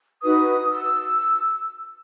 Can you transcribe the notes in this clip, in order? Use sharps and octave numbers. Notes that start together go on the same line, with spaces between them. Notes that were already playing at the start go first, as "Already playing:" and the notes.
D#4 F#4 B4 D#6
E6